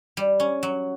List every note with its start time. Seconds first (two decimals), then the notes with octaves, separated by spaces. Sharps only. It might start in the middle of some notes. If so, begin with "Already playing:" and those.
0.17 G3
0.40 C#4
0.63 F#3